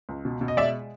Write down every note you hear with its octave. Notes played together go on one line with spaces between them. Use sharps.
C#2
B2
B2
D#5
G#3 D5 E5